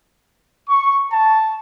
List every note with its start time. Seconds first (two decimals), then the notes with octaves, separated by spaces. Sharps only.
0.69 C#6
1.12 A5